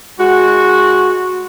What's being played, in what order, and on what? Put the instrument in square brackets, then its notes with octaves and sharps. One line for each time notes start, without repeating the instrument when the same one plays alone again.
[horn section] G#3 F#4